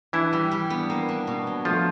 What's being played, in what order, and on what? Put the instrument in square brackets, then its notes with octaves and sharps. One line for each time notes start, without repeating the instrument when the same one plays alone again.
[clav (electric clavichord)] E3 E4 [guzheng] D4
[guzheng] G3
G3
B3
A#3
D4
B2
F#3
[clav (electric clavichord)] F3 F4 [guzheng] A3